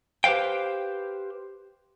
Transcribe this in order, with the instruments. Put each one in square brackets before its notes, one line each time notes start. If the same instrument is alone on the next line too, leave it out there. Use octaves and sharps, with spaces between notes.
[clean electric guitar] G4 B4 C5 F5 G5